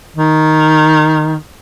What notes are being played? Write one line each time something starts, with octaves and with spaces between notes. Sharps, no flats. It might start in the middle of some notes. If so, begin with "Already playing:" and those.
D#3